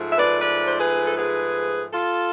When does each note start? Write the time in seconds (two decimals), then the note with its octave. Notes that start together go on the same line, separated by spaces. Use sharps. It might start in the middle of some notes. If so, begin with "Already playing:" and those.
Already playing: G#2 F3 A3
0.10 E5
0.17 B4 D5
0.41 B4 D5
0.67 C5
0.79 G#4 B4
1.06 A4
1.16 G#4 B4
1.91 F4 A4